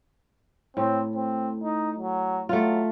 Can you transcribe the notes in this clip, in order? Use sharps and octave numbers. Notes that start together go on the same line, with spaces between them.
A2 C4
C4
D#4
F#3
F#3 A3 F4